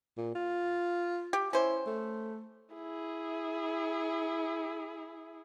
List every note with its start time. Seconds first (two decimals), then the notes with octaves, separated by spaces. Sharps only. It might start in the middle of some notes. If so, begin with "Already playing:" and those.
0.18 A#2
0.35 F4
1.33 G4
1.53 C#4 E4 C5
1.87 A3
2.74 E4 G#4